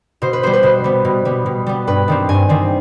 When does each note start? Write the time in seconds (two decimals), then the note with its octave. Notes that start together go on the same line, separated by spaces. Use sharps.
0.22 B2 C5
0.33 B4
0.43 B3 C5
0.47 G3
0.53 B4
0.63 B2 C5
0.84 G3 B3
1.05 B2
1.25 G3 B3
1.46 B2
1.66 G3 B3
1.87 G2 B4
2.08 D#3 G3 C4
2.29 G2 G#5
2.49 D#3 G3 C4